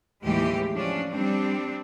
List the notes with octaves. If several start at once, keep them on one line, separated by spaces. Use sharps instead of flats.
D#2 A2 E3 F#3 G#3 G4
F3 C#4 D4
G3 C4 D4